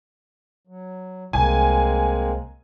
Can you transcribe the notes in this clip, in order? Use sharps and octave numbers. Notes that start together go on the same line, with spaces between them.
F#3
C2 G#3 A#3 C4 G#5